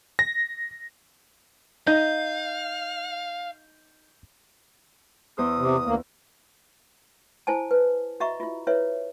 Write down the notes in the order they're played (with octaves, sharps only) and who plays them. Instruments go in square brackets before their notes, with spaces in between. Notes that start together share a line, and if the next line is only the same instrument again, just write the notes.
[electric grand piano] A#6
[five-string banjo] D#4 [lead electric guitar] F5 [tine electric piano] G6
[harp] E2 C5 E6 [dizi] D#6
[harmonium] C3
D2 A#3
[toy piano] E4 C5 G#5 A5
B4
F#4 D#5 E5 A#5 C#6
E4 F4
E4 B4 C#5 E5